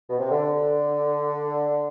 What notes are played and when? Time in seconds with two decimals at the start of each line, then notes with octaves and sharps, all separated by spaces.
0.10 B2
0.19 C3
0.31 D3